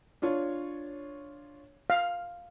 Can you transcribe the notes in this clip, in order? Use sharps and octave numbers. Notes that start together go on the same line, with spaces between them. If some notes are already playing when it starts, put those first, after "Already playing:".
D4 F4 C#5
F5